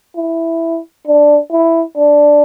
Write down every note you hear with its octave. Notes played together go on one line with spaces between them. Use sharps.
E4
D4
E4
D4